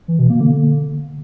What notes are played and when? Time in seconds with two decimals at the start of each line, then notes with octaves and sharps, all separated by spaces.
0.08 E3
0.19 B2
0.30 A#3
0.41 D3